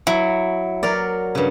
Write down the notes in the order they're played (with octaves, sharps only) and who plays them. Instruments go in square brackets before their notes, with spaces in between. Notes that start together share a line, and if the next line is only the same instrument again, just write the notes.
[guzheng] F#3 [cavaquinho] E4
[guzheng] F#3 A#4 D5
G2 C#3